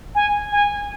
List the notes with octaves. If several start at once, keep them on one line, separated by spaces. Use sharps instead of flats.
G#5
G#5